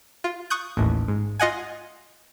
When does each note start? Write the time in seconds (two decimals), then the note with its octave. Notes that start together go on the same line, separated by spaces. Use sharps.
0.24 F4
0.50 C#6 D#6 F#6 G6
0.77 A1 D#2 A2
1.08 G#2
1.40 F4 D#5 F#5 G#5